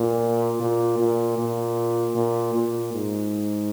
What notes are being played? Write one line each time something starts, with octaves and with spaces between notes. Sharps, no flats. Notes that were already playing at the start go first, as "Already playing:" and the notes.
Already playing: A#2
A#2
A#2
A#2
A#2
A#2
G#2